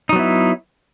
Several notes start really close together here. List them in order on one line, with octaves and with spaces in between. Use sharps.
D#4 F#3 B3 E4